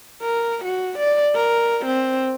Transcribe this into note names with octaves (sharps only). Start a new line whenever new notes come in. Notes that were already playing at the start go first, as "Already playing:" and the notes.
A#4
F#4
D5
A#4
C4